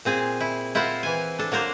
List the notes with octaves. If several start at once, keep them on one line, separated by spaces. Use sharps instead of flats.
A#2 C4 G#4
E4
E4 F4 A#4 C5 F#5
E3 G#5
D4 A4
F#3 A#3 A#4 C5